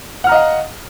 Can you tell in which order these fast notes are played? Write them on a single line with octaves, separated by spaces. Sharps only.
F#5 F6 A#5 D#5 F5